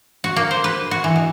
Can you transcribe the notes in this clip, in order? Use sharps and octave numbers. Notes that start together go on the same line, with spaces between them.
F#4
A#3
C5
B4
F#4
E3
B2